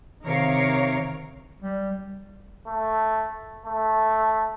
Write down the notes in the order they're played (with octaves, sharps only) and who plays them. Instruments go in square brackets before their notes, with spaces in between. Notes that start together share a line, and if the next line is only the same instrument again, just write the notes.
[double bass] C3 D#3 [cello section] A#4 C#5 F5
[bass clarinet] G3
[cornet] A3
A3